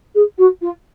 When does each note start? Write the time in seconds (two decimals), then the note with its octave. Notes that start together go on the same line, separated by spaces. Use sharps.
0.15 G#4
0.38 F#4
0.61 F4